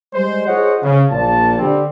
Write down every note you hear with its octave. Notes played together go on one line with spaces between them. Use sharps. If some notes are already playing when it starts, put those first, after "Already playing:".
G3 G#3 C5
F4 G#4 C5 C#5 D#5 F#5
C#3
A#1 A#2 A5
D3 G3 C4